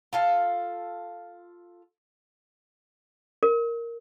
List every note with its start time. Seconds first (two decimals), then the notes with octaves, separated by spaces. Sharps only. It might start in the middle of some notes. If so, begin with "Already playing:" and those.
0.13 F4 A4 F5
3.43 A#4